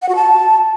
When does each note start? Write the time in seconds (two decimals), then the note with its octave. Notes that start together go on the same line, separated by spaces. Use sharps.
0.02 F#5
0.09 F#4
0.15 A5